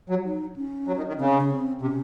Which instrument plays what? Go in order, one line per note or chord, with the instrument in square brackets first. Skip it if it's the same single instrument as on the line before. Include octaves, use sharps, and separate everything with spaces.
[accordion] F#3
[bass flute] D#4
C#4
[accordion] F#3
D#3
D#3
[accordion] C#3 [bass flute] C4
[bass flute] C#4
C#4
C4
[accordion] C3 [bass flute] C#4